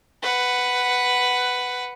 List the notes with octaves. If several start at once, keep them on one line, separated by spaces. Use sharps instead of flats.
B4 F#5